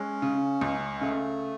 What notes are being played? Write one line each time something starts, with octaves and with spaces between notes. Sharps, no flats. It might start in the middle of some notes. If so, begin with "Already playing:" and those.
Already playing: G#3 C#4
C#3
C#2
C#3 A3